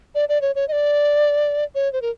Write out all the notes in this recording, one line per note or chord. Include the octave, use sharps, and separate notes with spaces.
D5
D5
C#5
C#5
D#5
D5
C#5
C5
A#4